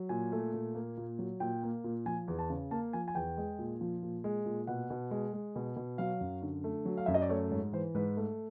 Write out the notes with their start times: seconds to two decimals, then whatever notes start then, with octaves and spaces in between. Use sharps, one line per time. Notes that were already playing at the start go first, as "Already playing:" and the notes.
Already playing: F#3
0.09 A#2 G#5
0.32 A3
0.54 A#2
0.75 A#3
0.97 A#2
1.19 F#3
1.40 A#2 G5
1.63 A#3
1.84 A#2
2.06 F3 G#5
2.28 E2
2.39 A5
2.50 C#3
2.71 A#3 A5
2.93 F3 G#5
3.08 G#5
3.15 E2 G5
3.38 G#3
3.59 A#2
3.81 F3
4.03 A#2
4.24 G#3
4.46 A#2
4.67 B2 F#5
4.90 B2
5.11 G#3
5.33 G#3
5.56 B2
5.76 B2
5.98 F#3 F5
6.21 F#2
6.42 D3
6.64 A3
6.85 F#3
6.97 F5
7.06 F#2 E5
7.14 D#5
7.22 D5
7.29 A3 C#5
7.51 G#2 C#5
7.73 E3 C5
7.95 G#2 B4
8.17 A3